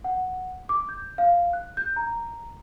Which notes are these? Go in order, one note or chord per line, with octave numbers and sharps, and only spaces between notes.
F#5
D6
G6
F5
F#6
G6
A#5